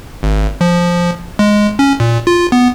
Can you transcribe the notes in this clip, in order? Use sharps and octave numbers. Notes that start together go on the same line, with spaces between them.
G#1
F3
G#3
C#4
A#2
F4
B3